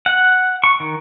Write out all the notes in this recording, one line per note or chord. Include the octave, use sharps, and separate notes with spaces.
F#5
C#6
D#3